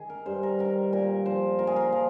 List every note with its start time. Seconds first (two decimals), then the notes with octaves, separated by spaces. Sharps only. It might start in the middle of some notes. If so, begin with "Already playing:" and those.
Already playing: D#3 G#4
0.10 A#4
0.26 G2 C5
0.43 A#4
0.59 D#3 A#4
0.93 A#2 A#4
1.26 F3 C5
1.59 A#2 A#4
1.67 G#4
1.76 A#4
1.92 F3